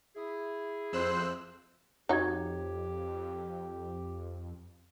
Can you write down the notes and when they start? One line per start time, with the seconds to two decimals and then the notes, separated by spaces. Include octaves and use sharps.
0.16 E4 G#4
0.93 F2 C5 E6 F#6
2.09 F2 D#4 F#4 G4 C#5 G#6